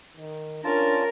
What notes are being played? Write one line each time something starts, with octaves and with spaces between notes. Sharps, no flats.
D#3
C#4 D4 F4 A#4 A5